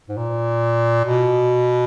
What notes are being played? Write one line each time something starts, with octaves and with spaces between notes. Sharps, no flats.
G#2
A#2
B2